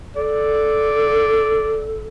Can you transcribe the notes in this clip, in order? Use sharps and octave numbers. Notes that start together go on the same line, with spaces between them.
A4 D5